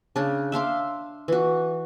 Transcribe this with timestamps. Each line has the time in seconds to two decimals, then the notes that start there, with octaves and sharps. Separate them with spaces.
0.16 C#3 D4
0.52 E5 F5 C6 D6
1.28 E3 F#4